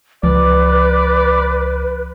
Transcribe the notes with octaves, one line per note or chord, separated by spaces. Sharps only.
C#2 F3 B4 D5